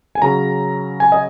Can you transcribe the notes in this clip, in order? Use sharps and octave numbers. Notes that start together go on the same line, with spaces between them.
G#5
C#3 F#3 C#4 A#5
G#5
D#5